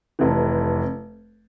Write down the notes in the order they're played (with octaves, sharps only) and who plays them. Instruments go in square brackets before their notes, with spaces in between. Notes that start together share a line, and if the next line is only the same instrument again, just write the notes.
[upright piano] F1 F2 C3 E3